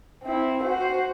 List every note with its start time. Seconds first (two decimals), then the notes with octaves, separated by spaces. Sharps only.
0.23 C4 E4
0.63 F#4 C5